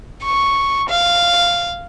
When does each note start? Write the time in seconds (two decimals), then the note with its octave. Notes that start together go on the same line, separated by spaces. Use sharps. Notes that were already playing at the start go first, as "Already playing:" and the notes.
0.24 C#6
0.89 F5